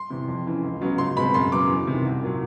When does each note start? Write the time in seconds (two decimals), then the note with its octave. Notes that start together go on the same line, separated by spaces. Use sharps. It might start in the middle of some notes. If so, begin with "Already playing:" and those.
Already playing: C6
0.10 E2 C3
0.28 F2
0.46 C#3 E3
0.63 C#2
0.81 C#3 F#3 B3
0.98 C#2 C6
1.17 B2 G#3 C4 B5
1.34 F#2 C6
1.52 C#3 F#3 B3 D6
1.70 E2
1.87 C3 D#3
2.05 C2
2.23 A#2 F#3